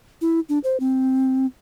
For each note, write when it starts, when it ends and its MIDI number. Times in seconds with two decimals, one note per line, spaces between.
0.21 0.40 64
0.49 0.59 62
0.64 0.77 72
0.80 1.46 60